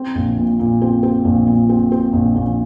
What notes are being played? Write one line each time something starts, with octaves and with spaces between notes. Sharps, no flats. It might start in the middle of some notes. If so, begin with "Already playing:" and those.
Already playing: C4
A#1
A#2
A#2
C4
C4
A#1
A#2
C4
C4
A#1
A#1